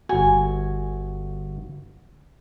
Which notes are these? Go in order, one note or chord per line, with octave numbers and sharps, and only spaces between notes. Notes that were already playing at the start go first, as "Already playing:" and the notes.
G1 F#4 G#5